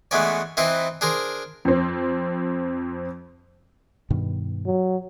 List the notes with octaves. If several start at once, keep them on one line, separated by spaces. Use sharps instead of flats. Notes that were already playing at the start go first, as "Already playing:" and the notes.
E3 G#3 A3 B3 C#4 D5
E3 C4 D#4 E4 B4 C5
D4 G#4 A#4 C5
F2 C4
G2 B2 D#3
F#3